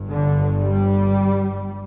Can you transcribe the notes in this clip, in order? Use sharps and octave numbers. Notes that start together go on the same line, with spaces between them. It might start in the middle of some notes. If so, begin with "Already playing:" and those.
Already playing: G1 G2
D3
G3